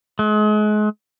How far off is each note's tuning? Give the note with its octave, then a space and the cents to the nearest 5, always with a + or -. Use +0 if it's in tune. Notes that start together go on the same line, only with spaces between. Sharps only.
G#3 +35